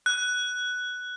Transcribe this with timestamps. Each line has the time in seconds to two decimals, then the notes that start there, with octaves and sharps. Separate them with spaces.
0.06 F#6